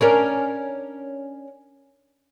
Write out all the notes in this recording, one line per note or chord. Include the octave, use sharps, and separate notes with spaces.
C#4 D4 A#4